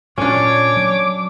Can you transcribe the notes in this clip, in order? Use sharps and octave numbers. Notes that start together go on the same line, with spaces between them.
A#2 C#4 D4 C#5 D6
F#3